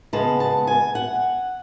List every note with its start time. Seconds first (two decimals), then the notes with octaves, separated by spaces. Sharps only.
0.13 C#3 G#3 B3 A5
0.40 A5
0.67 G#5
0.95 F#5